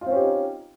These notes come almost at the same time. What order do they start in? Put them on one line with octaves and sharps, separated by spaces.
F4 C4 C#4 G4 D#4